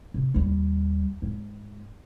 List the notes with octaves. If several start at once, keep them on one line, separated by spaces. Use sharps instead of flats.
C3
D#2 G3
G#2 G#3